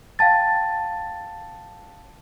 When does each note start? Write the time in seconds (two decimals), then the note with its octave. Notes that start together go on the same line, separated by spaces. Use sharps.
0.19 F5 G5 A5 A6